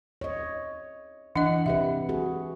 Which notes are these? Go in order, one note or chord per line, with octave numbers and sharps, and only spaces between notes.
C#5 D#5
E3 D4 D#5 F#5
C3 G4 B4 E5
F#4 G#4